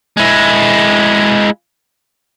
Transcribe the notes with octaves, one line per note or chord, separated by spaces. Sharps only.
G#3 E4